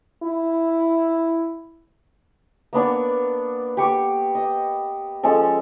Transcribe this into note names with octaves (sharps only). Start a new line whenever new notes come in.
E4
A#3 B3 D4 C#5
G4 C#6 D6
D#5
F3 G#3 C#4 A4